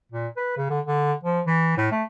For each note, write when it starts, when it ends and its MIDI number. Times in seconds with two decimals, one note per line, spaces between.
0.12 0.27 46
0.37 0.54 71
0.57 0.66 49
0.70 0.80 50
0.87 1.13 50
1.24 1.41 53
1.47 1.76 52
1.78 1.90 45
1.91 2.03 57